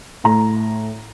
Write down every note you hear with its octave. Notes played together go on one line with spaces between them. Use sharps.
A2 A#5